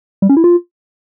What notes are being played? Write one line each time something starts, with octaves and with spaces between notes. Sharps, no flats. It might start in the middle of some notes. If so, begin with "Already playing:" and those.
G3
C#4
E4
F4